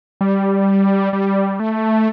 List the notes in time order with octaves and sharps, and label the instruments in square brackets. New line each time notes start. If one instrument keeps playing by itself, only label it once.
[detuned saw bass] G3
G3
A3